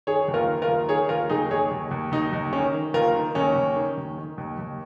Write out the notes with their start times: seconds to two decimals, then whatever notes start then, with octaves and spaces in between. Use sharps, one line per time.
0.07 D#3 G#4 C#5
0.28 D#2
0.34 F4 A#4
0.48 D#3
0.62 F4 A#4
0.68 D#2
0.89 D#3 G#4 C#5
1.09 D#2 F4 A#4
1.30 D#2 D#4 G#4
1.51 D#2 G#4 C#5
1.71 D#2
1.91 D#2
2.11 D#2 D#4
2.32 D#2
2.52 D#3 C#4
2.74 D#3
2.94 D#2 F4 A#4
3.15 D#3
3.35 D#2 C#4
3.56 D#2
3.76 D#3
3.97 D#2
4.18 D#3
4.38 D#2
4.59 D#2